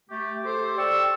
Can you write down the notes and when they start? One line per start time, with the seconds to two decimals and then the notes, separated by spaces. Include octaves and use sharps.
0.10 A3 G4
0.43 G4 A4 C5
0.78 D5 G5 C#6 E6